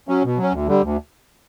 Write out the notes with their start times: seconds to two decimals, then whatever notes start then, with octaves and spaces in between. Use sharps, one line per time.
0.08 F#3 C#4
0.24 B2
0.38 F#3 C#4
0.53 D2
0.67 D3 G3
0.82 D2